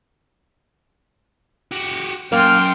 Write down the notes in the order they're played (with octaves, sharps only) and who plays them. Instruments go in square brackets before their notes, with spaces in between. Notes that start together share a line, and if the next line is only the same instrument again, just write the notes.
[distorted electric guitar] F#4 G4
[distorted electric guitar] F#2 [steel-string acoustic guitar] A#3 [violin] G5 C6 [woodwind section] F6